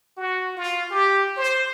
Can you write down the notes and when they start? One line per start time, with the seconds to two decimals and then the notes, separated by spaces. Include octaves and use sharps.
0.17 F#4
0.57 F4
0.91 G4
1.37 C5